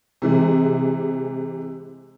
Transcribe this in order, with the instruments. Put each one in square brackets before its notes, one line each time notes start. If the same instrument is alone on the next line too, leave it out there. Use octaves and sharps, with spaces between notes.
[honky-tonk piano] C3 E3 G#3